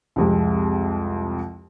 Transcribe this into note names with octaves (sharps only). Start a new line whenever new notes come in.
C2 F2 G#3